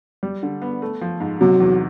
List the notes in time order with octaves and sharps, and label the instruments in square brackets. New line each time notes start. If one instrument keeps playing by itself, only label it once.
[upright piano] G3
D3
B3
A3
F3
G#2
[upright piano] C3 [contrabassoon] F#3
[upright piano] E2